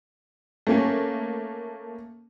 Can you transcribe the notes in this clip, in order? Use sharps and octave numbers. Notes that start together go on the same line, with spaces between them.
A3 A#3 C#4